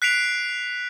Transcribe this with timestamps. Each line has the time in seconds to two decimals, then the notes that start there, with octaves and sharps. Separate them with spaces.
0.02 F#6 B6 C7 D7 F7